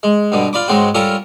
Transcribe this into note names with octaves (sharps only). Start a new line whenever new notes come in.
G#3
G2 B2 D3
F4 D5 B5 D6
G#2 C#3 G#3 C4 F#4
G3 C#4 F4 A4 A#4